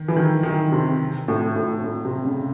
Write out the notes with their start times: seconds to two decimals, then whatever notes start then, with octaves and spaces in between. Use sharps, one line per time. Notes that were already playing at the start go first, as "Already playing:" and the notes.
Already playing: D#3
0.08 E3
0.16 D#3
0.43 D#3
0.72 C3
1.28 A2
1.56 A2
1.84 A2
2.05 C3
2.25 C#3